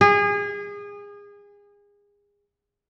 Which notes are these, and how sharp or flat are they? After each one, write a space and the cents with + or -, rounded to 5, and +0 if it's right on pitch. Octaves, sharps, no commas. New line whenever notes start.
G#4 -30